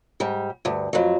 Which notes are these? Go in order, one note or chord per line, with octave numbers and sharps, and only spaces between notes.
G#2 G3
D2 G2
F2 F#3